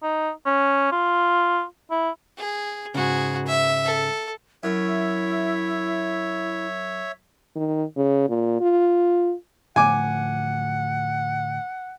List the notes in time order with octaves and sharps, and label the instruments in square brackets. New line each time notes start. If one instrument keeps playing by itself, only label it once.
[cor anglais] D#4
C#4
F4
E4
[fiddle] G#4
[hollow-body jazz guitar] G#2 C#3 [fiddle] F#4 G#4
[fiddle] E5
A4
[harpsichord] F#2 [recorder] E4 [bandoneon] C#5 E5
[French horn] D#3
C#3
A#2
F4
[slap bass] A2 D3 F3 [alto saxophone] F#5 [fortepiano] G#5 D6